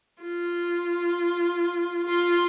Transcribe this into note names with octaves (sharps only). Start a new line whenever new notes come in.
F4
F4 C6